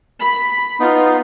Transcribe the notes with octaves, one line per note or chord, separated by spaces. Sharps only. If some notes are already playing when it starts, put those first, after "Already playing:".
B5
B3 D#4 F4